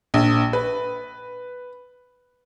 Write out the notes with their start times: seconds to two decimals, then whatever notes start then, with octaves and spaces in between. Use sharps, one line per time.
0.14 A#1
0.53 B4